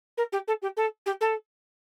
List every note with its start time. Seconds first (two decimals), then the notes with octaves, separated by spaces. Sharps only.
0.18 A#4
0.32 G4
0.48 A4
0.62 G4
0.77 A4
1.06 G4
1.21 A4